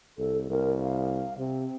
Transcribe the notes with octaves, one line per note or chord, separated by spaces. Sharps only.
C2 A4
C2 A#4
F5
C3 C4